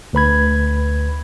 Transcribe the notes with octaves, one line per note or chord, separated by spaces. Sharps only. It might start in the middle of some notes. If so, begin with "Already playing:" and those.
D2 B4 B5 G#6